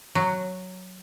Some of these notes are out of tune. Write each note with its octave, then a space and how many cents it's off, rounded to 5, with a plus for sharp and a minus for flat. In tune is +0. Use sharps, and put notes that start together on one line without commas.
F#3 +0